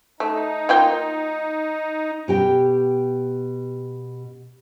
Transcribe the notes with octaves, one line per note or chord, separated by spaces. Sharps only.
A3 D#4
A#3 F4 G5
B2 G4 G5